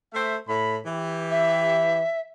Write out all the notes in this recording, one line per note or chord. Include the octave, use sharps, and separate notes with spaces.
A3 C5 E5
A2 B5
E3 G4
E5